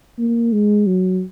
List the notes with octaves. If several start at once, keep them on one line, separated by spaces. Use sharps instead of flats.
A#3
G#3
F#3